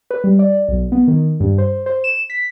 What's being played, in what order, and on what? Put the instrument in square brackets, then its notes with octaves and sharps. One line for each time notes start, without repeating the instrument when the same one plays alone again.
[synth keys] B4
G3
D5
B1
B3
D#3
G2
C5
C5
E7
B6